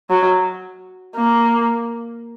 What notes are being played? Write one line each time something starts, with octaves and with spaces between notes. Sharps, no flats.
F#3
A#3